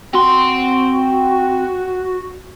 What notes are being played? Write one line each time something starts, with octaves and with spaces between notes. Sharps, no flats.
C4 F#4 C6